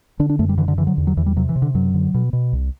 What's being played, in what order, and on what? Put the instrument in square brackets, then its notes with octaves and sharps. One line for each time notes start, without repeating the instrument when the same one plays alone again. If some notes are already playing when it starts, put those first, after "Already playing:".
[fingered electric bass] D3 D4
D4
F#2 A3
G3
D3 E3
D3
D3 E3
F#3
E2
F#3
E2 E3
G3
C3 F#3
E3
C3
D3
F#2 F#3
D3
B2
B2
C2